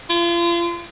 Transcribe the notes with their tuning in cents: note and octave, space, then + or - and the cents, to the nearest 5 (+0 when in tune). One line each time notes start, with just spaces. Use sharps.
F4 -35